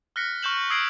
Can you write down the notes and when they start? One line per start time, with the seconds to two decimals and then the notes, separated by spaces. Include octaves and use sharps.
0.16 F6 F#6 A#6 B6 C#7
0.43 C#6 F6 G6 E7 F#7
0.70 D#6 E6 G#6 C7 D7 F#7